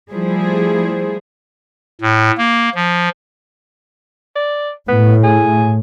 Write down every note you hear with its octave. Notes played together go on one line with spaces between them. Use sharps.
F3 G3 A3 E4 G#4 C5
A2
A#3
F3
D5
A2 B3
G#4